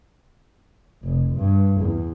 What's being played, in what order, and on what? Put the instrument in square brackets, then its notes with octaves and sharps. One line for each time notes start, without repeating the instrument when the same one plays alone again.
[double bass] F1
G2
E2